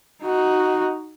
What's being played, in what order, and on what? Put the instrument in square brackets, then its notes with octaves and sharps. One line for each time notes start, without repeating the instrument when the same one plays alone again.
[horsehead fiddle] D#4 F#4